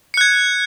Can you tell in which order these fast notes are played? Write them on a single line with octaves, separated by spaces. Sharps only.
C#7 F#6 G#6